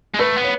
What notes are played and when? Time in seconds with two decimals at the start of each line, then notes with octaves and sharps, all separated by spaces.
0.14 G#3
0.19 A3 B4
0.36 B3
0.44 C#5